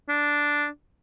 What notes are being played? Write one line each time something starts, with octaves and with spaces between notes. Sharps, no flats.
D4